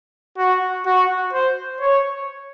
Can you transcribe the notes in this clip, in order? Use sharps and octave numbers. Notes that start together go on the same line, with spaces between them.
F#4
F#4
C5
C#5